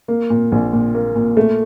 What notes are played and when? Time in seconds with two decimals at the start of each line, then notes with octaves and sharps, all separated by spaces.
0.08 A#3
0.30 A#2
0.52 A#1
0.73 A#2
0.94 A#3
1.15 A#2
1.37 A3